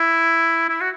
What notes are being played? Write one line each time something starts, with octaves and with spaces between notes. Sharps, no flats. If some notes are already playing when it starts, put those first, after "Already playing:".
Already playing: E4
E4
F#4